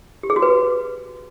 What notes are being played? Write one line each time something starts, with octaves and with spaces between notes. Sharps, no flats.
G4
G#4
F#4
B4